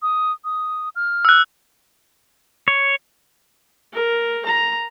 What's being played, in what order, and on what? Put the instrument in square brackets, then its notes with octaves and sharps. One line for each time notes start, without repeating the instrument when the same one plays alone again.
[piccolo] D#6
D#6
F6
[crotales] E6 F#6
[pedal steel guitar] C#5
[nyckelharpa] A#4
A#5